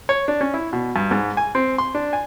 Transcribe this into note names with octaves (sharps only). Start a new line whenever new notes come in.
C#5
D4
C#4
E4
B2
G2
G#2
G#5
C4
C6
D4
G#5